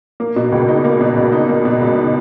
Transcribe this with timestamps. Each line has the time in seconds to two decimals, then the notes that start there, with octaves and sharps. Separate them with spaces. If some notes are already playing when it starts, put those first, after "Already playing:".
0.20 A#3
0.36 B2
0.52 C#2
0.68 D#4
0.84 A#3
1.01 B2
1.17 C#2
1.32 D#4
1.49 A#3
1.65 B2
1.81 C#2
1.97 D#4